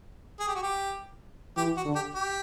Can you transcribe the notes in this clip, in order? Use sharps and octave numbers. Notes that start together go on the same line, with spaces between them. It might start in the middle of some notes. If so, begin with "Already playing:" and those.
G#4
G4
F#4
G4
E3 G4
F#4
D3
G4
G4